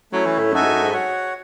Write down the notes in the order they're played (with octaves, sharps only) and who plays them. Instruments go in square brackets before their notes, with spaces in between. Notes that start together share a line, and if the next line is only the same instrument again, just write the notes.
[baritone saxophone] F#3 [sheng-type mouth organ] A3 C#4 E4
[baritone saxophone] E3
A2
[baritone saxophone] F#2 [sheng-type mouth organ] D#4 F#4 A4 E5 G#5
[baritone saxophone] G#2
F#2
G#2
[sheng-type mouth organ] F#4 C#5 F#5